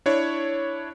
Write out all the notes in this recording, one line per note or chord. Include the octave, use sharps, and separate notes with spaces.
D4 E4 C#5